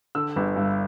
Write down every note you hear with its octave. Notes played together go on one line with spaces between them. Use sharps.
D3 E6
G1
G2